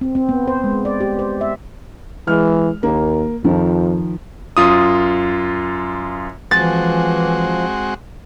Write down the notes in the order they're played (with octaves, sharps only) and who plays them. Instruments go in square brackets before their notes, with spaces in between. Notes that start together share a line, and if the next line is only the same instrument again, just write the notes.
[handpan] C4
C4
B3
C5
G#3
D5
G4
C5
E5
[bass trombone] E3 [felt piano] G#3 F6
[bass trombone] D#2 [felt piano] A#3
[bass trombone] F2 [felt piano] D#3 F3
[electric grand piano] F#2 F4 D#6
[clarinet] E3 [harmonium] F3 [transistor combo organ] G#3 C4 F#4 [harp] A6